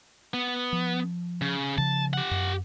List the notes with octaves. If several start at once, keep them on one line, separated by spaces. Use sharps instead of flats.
B3
F3
C#3
C#3 F3 A5
G4 F#5
F#2